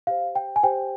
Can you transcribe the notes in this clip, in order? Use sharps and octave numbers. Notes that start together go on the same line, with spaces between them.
G4 C5 F5
G5
G#5
G4 C5 G5